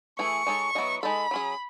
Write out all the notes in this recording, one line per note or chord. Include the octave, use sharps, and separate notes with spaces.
E3 A3 E4 G#4 C#6
G#3 D#4 A4 C#5
F#3 B3 E4 G#4 D#5
G#3 D#4 A4 B5
F#3 C#4 G#4